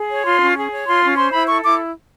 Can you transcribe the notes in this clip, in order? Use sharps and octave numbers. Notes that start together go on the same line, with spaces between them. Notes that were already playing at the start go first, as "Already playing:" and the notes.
Already playing: G#4
C#5
F4 C6
C#4
G#4
C#5
F4 C6
C#4
C5 C6
E4 B5
A4 C#6
E4 D6